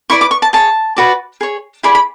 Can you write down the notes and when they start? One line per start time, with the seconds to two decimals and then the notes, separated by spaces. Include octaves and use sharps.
0.10 E4 B4 D5 C#6
0.21 D6
0.31 C#6
0.42 A5
0.53 G#4 C#5 A5
0.97 F#4 B4 D5
1.41 G#4 C#5
1.83 E4 G#4 D5 B5
1.95 B5